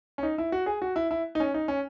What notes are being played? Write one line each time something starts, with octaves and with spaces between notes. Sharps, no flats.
C#4
D#4
E4
F#4
G#4
F#4
E4
E4
D#4
C#4
D#4
C#4